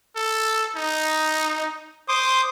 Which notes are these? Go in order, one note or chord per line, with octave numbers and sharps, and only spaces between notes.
A4
D#4
C5 C6 D6 D#6